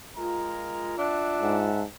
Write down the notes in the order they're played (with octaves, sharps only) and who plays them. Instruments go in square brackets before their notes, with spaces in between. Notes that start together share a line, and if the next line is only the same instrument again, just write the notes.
[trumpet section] G#3 A#4 A#5 [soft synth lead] F4
[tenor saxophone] D4 [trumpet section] E5 F#5 A5
[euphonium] G#2